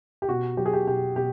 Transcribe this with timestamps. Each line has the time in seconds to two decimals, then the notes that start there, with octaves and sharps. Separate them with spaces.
0.22 G4
0.29 B2 F#4
0.57 F#3 G4
0.66 G#4
0.73 G4
0.87 B2 G4
1.16 B2 G4